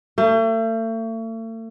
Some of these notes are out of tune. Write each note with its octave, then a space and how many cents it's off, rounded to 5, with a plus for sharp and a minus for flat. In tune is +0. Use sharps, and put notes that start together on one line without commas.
A3 +40